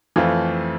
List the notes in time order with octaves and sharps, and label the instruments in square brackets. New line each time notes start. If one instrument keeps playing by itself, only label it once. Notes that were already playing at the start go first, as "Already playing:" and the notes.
[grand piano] F2 E3 A3 C4 F4